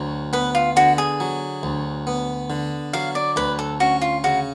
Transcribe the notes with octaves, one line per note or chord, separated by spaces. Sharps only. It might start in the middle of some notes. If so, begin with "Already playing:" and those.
Already playing: D2 F#3
B3 B4
F4
D3 F#4
G#4
F#3
D2
B3
D3
F#3 F5
D5
D2 B4
A4
C#4 F#4
F4
C#3 F#4